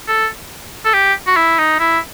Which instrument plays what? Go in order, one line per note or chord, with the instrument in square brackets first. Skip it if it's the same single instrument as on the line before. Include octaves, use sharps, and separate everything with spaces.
[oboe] A4
A4
G4
F#4
E4
D#4
E4